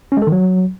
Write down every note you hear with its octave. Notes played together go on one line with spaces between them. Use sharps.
C#4
G#3
A4
D#3
F#3